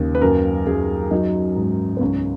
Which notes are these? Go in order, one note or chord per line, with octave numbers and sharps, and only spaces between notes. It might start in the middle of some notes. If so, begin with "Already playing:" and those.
Already playing: D#2 C#3
B4
F#2 A#4
F#2 G#4
F#3 D#4
G#2
B3
C#2 C#4